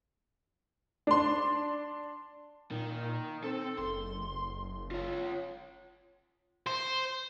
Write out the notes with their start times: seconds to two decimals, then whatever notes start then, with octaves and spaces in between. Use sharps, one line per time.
1.07 D4 C6
2.71 A#2 D#3
3.44 C4 A4
3.78 F#1 C6
4.91 F4 C#5
6.67 C5